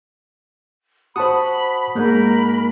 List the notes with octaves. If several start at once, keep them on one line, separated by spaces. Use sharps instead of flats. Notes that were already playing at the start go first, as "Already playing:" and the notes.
F#4 C5 A5 B5 D#6
G#2 A#3 A#4 B5 F#6 G6